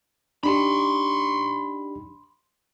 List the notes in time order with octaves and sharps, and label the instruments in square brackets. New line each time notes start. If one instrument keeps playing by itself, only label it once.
[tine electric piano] D4 D#4 G4 [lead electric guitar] B5 C6